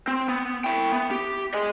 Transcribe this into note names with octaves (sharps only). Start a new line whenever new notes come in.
C4
B3
E4 G5
B3
G4
G#4 D#5